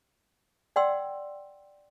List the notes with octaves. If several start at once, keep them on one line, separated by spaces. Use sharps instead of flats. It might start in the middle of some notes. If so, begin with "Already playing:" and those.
D5 F#5 G5 C6 E6